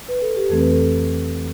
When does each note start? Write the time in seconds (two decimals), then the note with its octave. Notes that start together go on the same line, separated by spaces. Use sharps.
0.09 B4
0.22 A4
0.36 G4
0.49 F2 E3 A3 C4 A4
0.60 B4
0.71 A4